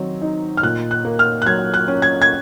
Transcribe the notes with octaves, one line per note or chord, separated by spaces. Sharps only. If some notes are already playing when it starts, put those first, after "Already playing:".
Already playing: D#3 F#3 C4
D#4
F6
A#2 F#6
F#6
A#3
F6
F#6
F#3 G#6
F#6
C#4
G#6
G#6